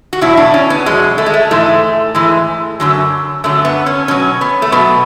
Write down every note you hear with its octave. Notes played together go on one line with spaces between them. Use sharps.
F#4
E2 B2 F#3 E4
D4
C#4
B3
E2 B2 F#3 G#3
A3
G#3
A3
G#2 E3 G#3 A3
G#2 E3 G#3
F#2 D3 F#3
F#2 D3 F#3 A3
B3
C#4
B2 F#3 C#4
B3
A3
B2 F#3 B3